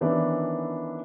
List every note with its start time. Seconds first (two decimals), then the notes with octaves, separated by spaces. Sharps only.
0.01 D#3 E3 B3 C#4 D4 E4